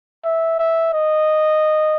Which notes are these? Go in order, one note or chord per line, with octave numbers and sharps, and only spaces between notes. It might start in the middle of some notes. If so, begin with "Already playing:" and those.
E5
E5
D#5